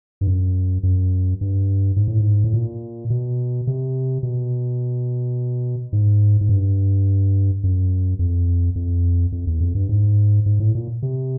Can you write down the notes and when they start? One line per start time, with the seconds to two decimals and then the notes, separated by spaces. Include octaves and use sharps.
0.21 G2
0.27 F#2
0.83 F#2
1.41 G2
1.96 G#2
2.08 A2
2.19 G#2
2.44 A2
2.54 A#2
3.10 B2
3.67 C3
4.23 B2
5.93 G#2
6.41 G#2
6.49 G2
7.63 F#2
8.19 F2
8.76 F2
9.32 F2
9.47 E2
9.60 F2
9.75 G2
9.89 G#2
10.46 G#2
10.60 A2
10.75 A#2
11.02 C3